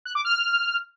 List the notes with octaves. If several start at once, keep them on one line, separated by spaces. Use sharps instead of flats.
F#6
D6
F6